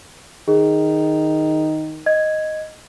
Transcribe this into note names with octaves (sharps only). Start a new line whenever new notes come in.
D#3 G#4
D#5 G#6